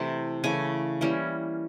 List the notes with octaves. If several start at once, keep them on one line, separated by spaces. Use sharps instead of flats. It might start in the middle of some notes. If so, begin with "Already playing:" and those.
Already playing: C3 E3 A3 A5
C#3 E3 A3 G#5
E3 G3 A#3 C#4